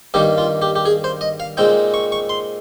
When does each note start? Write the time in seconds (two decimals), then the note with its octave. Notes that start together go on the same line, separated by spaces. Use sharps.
0.14 G2 D#3 A#3 D#4 G4
0.38 F4
0.62 G4
0.76 G4
0.86 G#4
1.04 C5
1.21 D#5
1.40 F5
1.57 A#2 G#3 C4 D#4 G5
1.94 C#6
2.12 C#6
2.29 C6